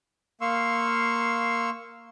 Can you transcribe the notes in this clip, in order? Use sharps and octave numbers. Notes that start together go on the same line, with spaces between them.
A#3 F5 C6 C#6 E6